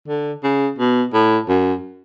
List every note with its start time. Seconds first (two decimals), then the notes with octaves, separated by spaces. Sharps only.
0.08 D3
0.44 C#3
0.79 B2
1.14 A2
1.49 F#2